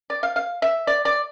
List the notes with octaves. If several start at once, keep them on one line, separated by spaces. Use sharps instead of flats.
D5
F5
F5
E5
D5
D5